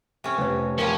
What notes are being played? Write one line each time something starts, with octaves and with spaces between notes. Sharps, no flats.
C3 C#4
F1 B4 C#5
F1 F3 G3 C#4 A#4 C#5